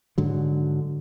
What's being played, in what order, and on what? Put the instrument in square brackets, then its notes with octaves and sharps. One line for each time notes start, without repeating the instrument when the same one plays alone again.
[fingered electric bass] G#2 D3 F#3